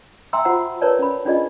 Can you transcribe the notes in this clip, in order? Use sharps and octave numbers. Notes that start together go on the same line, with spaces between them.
E5 G5 G#5 A#5 C6 E6
F4 F#4 C5 F#5 A#5
A#4 B4 C#5 D5 A5
C#4 B5
C#4 D4 F4 G#4 D5 D#5